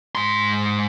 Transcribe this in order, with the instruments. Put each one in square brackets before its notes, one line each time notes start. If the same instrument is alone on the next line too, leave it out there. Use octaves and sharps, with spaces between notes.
[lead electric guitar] G#2 C6